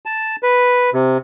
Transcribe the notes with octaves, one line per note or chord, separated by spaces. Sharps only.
A5
B4
C3